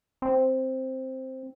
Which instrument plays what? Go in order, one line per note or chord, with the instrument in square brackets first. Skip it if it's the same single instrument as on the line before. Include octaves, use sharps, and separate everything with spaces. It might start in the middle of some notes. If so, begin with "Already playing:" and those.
[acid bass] C4